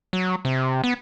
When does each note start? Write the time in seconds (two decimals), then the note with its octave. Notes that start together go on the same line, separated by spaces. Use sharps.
0.13 F#3
0.45 C3
0.84 B3